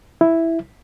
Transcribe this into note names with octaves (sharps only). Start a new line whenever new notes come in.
E4